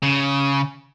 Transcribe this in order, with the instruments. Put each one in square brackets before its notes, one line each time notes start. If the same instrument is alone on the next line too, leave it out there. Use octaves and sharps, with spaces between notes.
[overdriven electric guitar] C#3